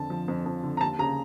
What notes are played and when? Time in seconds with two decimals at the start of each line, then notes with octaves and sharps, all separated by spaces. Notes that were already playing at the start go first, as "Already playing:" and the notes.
Already playing: F2 D3 A5
0.10 F3
0.28 F2
0.46 F2
0.63 D3
0.77 A#5
0.81 D#2 A5
0.99 C#3 A#5